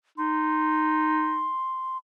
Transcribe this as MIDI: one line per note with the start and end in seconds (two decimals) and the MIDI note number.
0.18 1.52 63
0.18 1.97 84